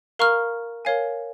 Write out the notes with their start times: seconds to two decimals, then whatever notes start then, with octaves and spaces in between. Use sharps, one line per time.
0.19 A#4 F5 A#5 C#6 F6
0.85 A#4 C#5 F5 G#5